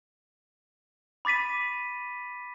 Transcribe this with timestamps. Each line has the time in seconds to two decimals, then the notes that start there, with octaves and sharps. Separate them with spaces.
1.25 B5 D6 A6 B6 D#7